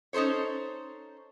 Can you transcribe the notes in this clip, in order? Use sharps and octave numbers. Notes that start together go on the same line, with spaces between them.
C#4 D#4 A4 C5 C#5